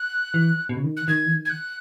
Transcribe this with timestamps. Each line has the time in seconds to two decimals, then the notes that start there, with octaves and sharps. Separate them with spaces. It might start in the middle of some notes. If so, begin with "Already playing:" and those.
Already playing: F#6
0.34 E3
0.69 B2
0.76 C#3
0.84 D#3
0.97 F#6
1.08 D#3 G#6
1.26 E3
1.34 D#3
1.45 G#6
1.50 F#6